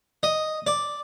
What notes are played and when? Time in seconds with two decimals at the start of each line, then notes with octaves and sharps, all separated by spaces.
0.23 D#5
0.67 D5